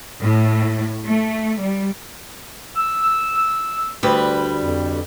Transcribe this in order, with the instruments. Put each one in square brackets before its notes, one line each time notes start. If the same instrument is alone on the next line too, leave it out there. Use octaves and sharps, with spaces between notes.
[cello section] A2
A3
G3
[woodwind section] E6
[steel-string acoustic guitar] D2 G3 B4
[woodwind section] F2